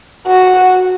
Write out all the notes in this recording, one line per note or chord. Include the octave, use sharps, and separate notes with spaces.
F#4